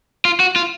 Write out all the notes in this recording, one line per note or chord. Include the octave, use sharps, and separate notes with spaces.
F4
F#4
F4